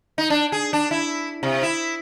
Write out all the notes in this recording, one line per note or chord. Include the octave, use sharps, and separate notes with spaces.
D#4
D4
G#4
D4
E4
C3
E4